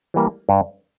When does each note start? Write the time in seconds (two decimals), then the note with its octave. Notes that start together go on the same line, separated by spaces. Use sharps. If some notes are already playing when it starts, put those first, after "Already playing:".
0.14 E3 G3 A#3
0.49 G2